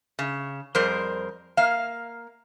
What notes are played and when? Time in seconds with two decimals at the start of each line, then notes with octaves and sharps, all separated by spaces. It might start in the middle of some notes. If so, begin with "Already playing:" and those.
0.19 C#3
0.75 F2 G3 G#4 A#4 C5
1.57 A#3 F5